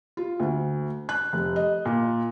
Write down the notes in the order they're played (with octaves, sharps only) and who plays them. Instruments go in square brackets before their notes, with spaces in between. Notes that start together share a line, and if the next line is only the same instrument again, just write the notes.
[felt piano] F4
D2
F#6
F1
D#5
A#2